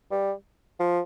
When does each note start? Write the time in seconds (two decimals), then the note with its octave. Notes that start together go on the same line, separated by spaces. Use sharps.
0.11 G3
0.80 F3